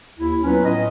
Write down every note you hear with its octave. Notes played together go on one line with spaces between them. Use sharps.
D#2 E4
F#3 B3 C#4 F4 B4
A2 D#5